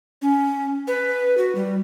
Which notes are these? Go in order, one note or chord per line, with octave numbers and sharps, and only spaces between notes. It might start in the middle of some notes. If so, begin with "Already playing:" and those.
C#4
B4
F#4
G3